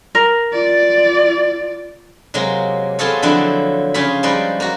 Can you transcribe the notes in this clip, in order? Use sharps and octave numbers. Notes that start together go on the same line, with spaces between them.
A#4
F4 D5
C3 F#3 G#3 A#3
B3 C4 F4 G#4 A4 C#5
D3 F3 F#3 C4 E4
C#3 F4 G#4 C#5 B5
F3 G3 G#3 D#4 B4 D5
A#3 F#4